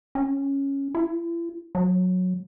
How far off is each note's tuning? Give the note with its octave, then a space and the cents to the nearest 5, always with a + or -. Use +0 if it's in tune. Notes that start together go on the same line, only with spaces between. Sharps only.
C#4 -5
E4 +40
F#3 -15